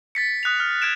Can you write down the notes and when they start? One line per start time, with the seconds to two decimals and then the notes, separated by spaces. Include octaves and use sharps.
0.15 A6 B6 C#7
0.43 D#6 F#6 B6 F7
0.60 F6
0.82 F#6 G#6 D7 E7